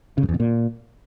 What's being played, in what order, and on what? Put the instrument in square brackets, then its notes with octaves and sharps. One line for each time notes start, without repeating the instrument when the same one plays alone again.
[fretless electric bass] C#3
G2
E2
B2
A#2